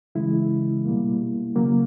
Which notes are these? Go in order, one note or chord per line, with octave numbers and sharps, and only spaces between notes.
C#3 E3 G#3 E4
B2 G3 A#3
C#3 F#3 A#3